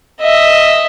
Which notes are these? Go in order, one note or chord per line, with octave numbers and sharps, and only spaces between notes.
D#5 E5